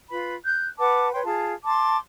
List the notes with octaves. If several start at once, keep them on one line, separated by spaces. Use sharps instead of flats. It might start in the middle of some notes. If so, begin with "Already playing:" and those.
F4 B4 B5
F#6 G6
B4 F#5 A5 D6
B4 C#5 G5 C6
F4 G#4 A5
A5 C6 D6